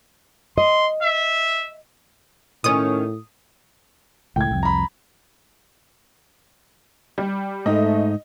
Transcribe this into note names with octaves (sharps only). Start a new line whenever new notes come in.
D#5 C6
E5
A2 D#3 C#4 D#6
C#2 A2 G5 G#6
C2 F2
A#5 B5
G3
G#2 A3 D#4 D#5